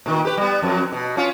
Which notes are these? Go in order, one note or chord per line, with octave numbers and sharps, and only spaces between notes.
A#2 D#3
G4 B4
G3 B3
F2 F#3
B2
C#4 F4